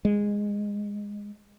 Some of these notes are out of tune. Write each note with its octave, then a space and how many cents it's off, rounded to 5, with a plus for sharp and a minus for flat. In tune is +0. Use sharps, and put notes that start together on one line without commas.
G#3 -15